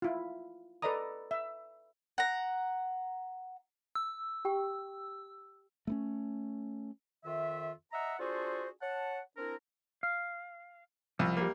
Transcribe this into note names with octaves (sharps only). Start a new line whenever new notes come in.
E4 F4
A4 B4 D5 D#5 A#5 D#6
E5
F#5 A#5
E6
G4 G5 C#6
A3 B3 C#4
F2 D#3 F4 E5
D#5 E5 F#5 A#5
D4 F4 F#4 G#4 A4 C5
C#5 F#5 A5
C4 D4 E4 A#4
F5
C2 F3
G3 A#3